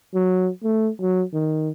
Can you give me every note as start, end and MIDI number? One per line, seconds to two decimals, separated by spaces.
0.15 0.49 54
0.64 0.89 57
1.01 1.23 54
1.33 1.69 51